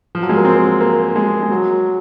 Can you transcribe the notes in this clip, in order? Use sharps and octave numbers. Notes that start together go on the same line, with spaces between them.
F3
F#3
G#3
A#3
C4
A#3
G#3
G#3
F#3